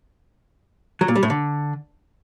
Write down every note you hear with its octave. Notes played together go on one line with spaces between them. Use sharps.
F#3
A#2
G3
A2
D3